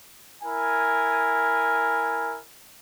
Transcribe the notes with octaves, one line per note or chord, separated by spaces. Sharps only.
E4 A#4 G#5